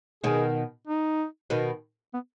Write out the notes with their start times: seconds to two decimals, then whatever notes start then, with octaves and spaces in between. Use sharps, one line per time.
0.24 B2 D#3 G#4
0.87 D#4
1.50 B2 D#3
2.14 B3